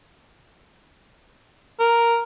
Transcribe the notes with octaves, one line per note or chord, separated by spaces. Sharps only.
A#4